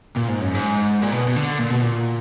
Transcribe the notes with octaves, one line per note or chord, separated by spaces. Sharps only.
A#2
G#2
F#2
G#2
A#2
B2
B2
D3
A#2
B2
A#2